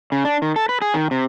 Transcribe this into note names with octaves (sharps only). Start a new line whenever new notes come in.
C#3
D4
D#3
A4
B4
G#4
D#3
C3